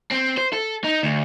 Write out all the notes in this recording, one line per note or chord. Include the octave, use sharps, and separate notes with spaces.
C4
C5
A4
D#4
D2